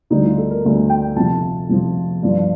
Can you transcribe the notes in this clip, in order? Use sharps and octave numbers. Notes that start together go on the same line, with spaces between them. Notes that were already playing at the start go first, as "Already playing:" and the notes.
D2 D3 G3 D#4
F4
A4
A#4
D2 D3 G3
G5
F2 C3 F3 A5
F2 C3 F3
G2 F3